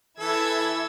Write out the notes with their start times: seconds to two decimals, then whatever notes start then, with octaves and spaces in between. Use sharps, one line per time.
0.20 E3 E4 A4 E6 G#6